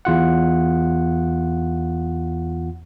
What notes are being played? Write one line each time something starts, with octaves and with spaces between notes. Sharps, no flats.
E2 F4 F#5